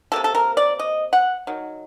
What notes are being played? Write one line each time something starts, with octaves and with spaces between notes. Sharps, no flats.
C3 G3 A#3 A4
A4
A#4
D5
D#5
F#5
D#3 F#3